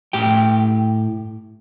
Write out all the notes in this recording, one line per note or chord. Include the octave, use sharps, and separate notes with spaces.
A2 G4 G5